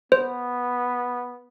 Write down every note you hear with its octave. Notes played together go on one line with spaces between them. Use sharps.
B3 C5